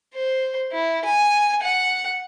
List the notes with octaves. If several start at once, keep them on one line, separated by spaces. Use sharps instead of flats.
C5
E4
G#5
F#5